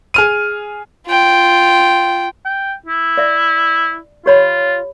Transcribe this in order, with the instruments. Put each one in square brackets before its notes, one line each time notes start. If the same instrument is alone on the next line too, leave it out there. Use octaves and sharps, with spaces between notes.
[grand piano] G#4 F6 D#7
[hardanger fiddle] F4 G5
[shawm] G5
E4
[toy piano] D5 E5
[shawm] F4 [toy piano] G4 C#5 B5